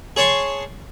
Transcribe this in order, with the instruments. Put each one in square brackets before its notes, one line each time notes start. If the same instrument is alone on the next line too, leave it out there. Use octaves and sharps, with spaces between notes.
[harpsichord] G#4 C#5 A5 C6 C#6